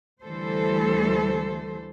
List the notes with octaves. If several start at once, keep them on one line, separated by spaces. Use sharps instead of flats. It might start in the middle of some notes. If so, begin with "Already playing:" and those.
D2 E3 G3 A3 A4 C5